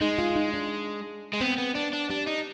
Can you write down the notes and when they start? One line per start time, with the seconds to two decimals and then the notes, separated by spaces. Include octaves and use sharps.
0.01 G#3 D#4
0.18 F4
0.36 D#4
0.54 D4
1.33 G#3
1.41 B3 C4
1.58 B3
1.75 B3 D4
1.93 D4
2.10 G3 D4
2.27 D#4